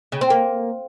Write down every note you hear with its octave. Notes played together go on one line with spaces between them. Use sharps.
C#3
C4
A#3